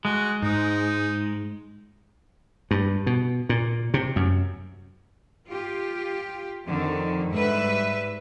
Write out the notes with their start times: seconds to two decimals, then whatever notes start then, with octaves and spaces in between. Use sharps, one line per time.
0.05 G#3 F#4
0.42 G#2 D#4
2.71 G2
3.06 B2
3.49 A#2
3.94 C3
4.16 F#2
5.47 F4 G4
6.65 F2 D3 D#3
7.30 G#2 G3 B4 E5